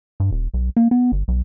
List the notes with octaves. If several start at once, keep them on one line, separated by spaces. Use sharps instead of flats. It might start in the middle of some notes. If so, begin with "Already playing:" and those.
G2
D#1
B1
A#3
B3
G1
B1